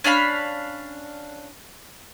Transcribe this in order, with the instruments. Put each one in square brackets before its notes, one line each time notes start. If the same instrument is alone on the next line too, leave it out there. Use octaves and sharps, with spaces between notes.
[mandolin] C#4 D4 F5 B5